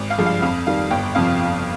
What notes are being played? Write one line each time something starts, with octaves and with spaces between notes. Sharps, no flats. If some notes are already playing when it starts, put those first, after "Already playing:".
Already playing: G#1
F5
G2 F3 G#3
F5
F2 F5
D#3 G3 F5
G1 G5
F2 C3 F3 F5